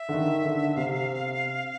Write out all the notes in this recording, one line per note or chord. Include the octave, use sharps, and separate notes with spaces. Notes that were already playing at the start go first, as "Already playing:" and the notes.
Already playing: E5
D3
D#3
D3
C3 F5